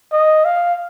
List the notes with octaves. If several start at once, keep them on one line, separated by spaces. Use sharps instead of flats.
D#5
F5